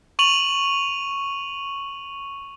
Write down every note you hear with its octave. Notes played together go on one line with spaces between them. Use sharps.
C#6 D#7 F7 F#7